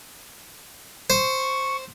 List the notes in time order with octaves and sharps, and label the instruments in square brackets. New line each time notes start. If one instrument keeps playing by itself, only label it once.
[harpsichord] C5 [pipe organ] C#6